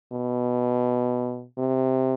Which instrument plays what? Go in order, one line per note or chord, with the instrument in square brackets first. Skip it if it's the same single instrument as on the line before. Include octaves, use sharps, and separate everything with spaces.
[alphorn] B2
C3